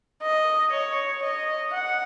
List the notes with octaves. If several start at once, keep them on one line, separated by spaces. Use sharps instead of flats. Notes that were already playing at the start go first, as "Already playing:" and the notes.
D#5
C#5
D#5
F#5